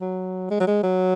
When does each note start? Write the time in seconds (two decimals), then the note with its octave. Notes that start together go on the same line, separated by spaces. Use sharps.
0.01 F#3
0.50 G#3
0.60 F#3
0.67 G#3
0.83 F#3